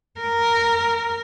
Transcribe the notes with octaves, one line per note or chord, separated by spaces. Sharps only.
A#4